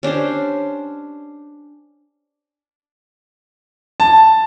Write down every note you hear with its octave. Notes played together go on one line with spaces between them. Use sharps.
C#4 D4 G4 C5
A5